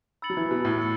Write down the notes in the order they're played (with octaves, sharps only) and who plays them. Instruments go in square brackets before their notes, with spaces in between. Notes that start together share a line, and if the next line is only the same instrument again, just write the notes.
[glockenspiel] B5 E6 A6 C#7 F#7
[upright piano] F#3
E3
B2
A2
[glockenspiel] B5 E6 A6 C#7